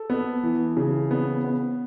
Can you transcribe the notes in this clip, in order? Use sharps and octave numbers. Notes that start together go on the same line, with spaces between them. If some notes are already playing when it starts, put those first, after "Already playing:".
Already playing: A4
B3
E3
C#3
B3
B3